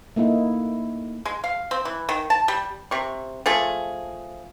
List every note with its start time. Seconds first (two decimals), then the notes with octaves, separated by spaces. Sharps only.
0.16 A3 A#3 D#4 E4
1.25 G#3
1.44 F5
1.71 C4
1.85 E3
2.09 D#3
2.30 A5
2.48 G3
2.91 C3 C#6
3.46 F3 A3 G#4